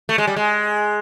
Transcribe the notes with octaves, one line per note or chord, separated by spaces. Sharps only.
A3
G#3
G3
G#3